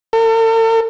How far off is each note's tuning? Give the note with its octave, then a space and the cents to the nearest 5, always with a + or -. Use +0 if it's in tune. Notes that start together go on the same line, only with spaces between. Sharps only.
A4 +45